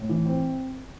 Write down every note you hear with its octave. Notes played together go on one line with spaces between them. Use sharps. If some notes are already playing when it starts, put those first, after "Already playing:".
Already playing: A2
E3
C4